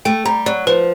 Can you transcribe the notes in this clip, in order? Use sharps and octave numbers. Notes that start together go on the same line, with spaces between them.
A3 G5
G3 A#5
F#3 D5
F3 B4